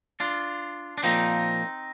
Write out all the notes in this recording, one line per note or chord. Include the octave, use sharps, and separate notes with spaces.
D4 F4
D4
A#2 F3 A#3 C4 D#4